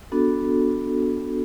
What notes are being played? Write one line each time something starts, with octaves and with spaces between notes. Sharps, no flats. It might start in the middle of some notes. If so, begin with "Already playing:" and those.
B3 D4 F#4 A4